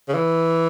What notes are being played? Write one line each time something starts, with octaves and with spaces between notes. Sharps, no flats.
C#3
E3